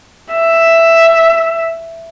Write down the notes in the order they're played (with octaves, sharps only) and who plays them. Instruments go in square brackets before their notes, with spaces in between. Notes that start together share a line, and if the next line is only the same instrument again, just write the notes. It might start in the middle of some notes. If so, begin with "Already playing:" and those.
[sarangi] E5